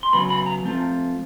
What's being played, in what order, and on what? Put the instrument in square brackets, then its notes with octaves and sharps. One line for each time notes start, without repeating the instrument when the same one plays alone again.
[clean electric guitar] C6
C#3 F#3 B3 B5
B5
A#5
F3 A3 C4 F4